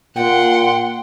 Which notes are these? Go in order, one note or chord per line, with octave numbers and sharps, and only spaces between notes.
A#2 F#5 G5 C6